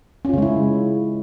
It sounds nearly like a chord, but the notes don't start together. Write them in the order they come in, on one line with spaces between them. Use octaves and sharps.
C#4 F4 C#3 G#3 E4